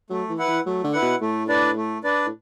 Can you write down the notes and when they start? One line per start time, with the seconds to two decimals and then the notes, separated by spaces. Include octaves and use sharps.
0.10 F#3 A3
0.29 E3
0.38 E4 B4 F#5
0.48 E3
0.65 F#3 A3
0.84 D3
0.93 E4 B4 F#5
1.02 B2
1.21 A2 A3
1.48 D4 B4 D5
1.76 A3
2.04 D4 B4 D5
2.26 A2